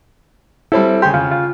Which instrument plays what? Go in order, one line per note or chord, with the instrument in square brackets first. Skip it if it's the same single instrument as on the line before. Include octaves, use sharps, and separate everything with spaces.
[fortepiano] G3 C4 A4 [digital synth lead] E4
[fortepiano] C#3 G#5 C6 [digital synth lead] G4
[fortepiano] C#3 [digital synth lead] F4
[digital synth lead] F4